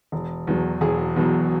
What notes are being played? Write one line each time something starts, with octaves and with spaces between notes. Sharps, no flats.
E1
E2 B2 F#3
E1 G#4
E2 B2 F#3